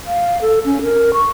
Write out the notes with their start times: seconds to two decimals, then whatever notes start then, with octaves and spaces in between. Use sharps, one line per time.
0.07 F5
0.42 A4
0.65 C#4
0.83 A#4
1.13 C#6